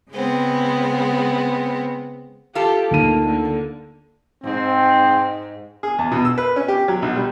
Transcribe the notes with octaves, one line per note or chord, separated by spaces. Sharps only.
C#3 G#3 B3 C4
F4 G4 A4
D2 A#3 D#4 D#7
D3 A#3
G#2 C4
G#4
E2
B2
E6
B4
C#4
G4
F#3
B1
G3